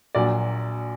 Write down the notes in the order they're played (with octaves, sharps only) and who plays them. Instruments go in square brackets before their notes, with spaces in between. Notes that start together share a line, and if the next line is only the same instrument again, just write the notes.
[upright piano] A#1 A#2 F#3 D5